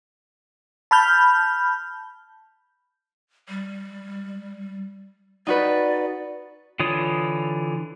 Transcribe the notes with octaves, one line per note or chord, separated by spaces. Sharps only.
A5 B5 F6 G6
G3
D#4 F#4 B4 D5
D3 E3 F4 C#5 D#6